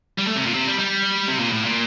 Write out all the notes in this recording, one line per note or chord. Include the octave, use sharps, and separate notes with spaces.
G3
A3
C3
A#2
C3
G3
G3
C3
A#2
A2
A#2